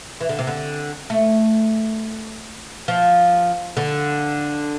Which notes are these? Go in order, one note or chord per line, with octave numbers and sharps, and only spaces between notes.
E3
D3
C3
D3
A3
F3
D3